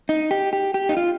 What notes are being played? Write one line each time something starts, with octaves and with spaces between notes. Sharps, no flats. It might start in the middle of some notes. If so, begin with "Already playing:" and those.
D#4
G4
G4
G4
D#4
F4